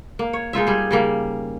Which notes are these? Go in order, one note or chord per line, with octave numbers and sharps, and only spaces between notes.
A#3
C#5
G#3 D#4 F4 E5
G3 G#4
C#3 G3 A#3